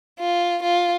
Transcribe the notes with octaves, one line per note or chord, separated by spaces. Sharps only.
F4
F4